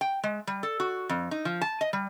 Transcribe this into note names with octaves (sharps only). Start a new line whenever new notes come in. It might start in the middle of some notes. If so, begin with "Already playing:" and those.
G5
G#3
G3
A4
F#4
F2
D#4
F3
A5
D#5
G3